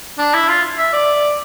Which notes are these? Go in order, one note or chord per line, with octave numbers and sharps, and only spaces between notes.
D4
E4
F4
E5
D5